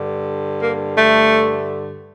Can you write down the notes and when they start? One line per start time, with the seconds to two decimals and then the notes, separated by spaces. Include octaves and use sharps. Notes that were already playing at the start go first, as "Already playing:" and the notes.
Already playing: G2 D3
0.61 A#3
0.95 A3